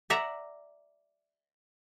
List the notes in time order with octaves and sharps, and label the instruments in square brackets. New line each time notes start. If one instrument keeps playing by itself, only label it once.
[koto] D5 E5 F#5 A#5